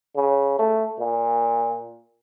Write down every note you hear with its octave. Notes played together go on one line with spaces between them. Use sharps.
C#3
A3
A#2